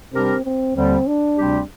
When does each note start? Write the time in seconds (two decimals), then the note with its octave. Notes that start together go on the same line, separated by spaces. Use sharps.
0.13 C3 G3 C4 D4 G4 A#4
0.44 C4
0.75 D#2 D3 G3 C4
1.07 D4
1.38 D2 C3 G3 C4 G4